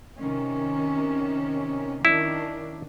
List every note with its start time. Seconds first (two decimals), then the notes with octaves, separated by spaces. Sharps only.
0.18 C3 D#3 C#4
2.05 D#3 C#4 D4 E4